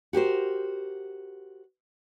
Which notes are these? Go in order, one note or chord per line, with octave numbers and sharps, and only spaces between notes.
F#4 G4 A#4 C5